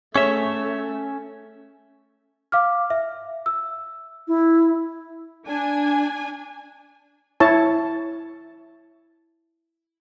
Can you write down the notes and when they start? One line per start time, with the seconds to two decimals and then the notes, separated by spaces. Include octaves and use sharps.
0.16 A3 C#4 G#4 C#5 E5
2.52 F5 D6 F6
2.90 E5
3.46 E6
4.28 E4
5.47 D4 G#5
7.40 E4 C#5 A5